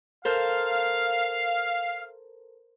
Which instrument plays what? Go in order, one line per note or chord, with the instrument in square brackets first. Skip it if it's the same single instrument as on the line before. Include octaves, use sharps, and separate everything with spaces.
[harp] A4 A#4 C5 [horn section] F5